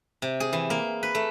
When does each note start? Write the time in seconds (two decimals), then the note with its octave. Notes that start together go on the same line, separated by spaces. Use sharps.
0.22 C3
0.40 G#4
0.53 E3
0.70 A#3
1.03 B4
1.15 A3